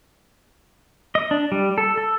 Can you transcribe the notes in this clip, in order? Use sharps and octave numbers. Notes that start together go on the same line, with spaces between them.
D#5
D4
G3
A4
A4